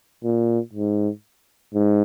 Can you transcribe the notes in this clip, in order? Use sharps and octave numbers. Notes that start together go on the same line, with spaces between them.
A#2
G#2
G#2